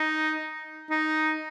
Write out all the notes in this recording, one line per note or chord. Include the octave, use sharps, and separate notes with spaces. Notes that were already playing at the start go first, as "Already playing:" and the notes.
Already playing: D#4
D#4